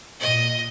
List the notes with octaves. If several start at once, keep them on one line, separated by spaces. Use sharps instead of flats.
A#2 D#5